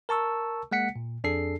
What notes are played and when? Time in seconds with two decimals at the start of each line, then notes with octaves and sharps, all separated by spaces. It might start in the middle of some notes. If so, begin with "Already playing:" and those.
0.09 A#4 A5 C#6 E6
0.71 G#3 A#3 F#5 B6 C#7
0.96 A#2
1.24 F2 D4 G#4 A4 C7